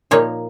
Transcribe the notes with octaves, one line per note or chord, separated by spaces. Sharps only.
A#2 F3 A#3 D#4 C#5